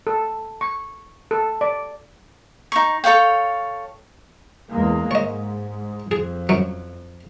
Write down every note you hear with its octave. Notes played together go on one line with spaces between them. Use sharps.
A4
C#6
A4
D5
D#4 C#6
A4 C#5 F5 G5
E2 G#3 A#3
G#2 C#5 D#5
F2 G#4
F#2 F#3